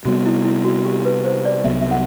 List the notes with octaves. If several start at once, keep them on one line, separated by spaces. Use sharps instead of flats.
C3 G3 B3 F#4
E4
E4
F#4
G4
B4
C5
D5
C2 C3 F#3 B3 E5
E5
F#5